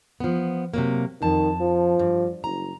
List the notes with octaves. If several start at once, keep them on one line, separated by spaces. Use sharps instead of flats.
F3 B3
C3 F#3 A#3
F2 D#3 A5
F3
G2
F#1 A#5